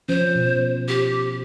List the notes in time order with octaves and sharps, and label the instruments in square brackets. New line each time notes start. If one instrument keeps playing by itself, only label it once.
[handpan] F3 C#4 [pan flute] C5
[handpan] B2
[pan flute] G4